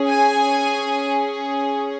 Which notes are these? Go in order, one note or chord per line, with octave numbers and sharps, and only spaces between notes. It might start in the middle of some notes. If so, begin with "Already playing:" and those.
Already playing: C#4 G#4
G#5